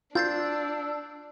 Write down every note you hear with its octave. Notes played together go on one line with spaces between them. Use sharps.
D4 F4 E6 G6 A6 C7